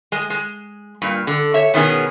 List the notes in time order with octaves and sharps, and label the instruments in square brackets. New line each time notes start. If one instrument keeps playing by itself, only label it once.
[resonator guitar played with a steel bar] G#3 D#5
G#3
G2 A#2
D3
C#5 E5
B2 D#3 B3 C#4 D#4 G#4